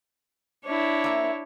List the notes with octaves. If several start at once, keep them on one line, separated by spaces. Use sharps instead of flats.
D4 E4 C#5
A#3 E5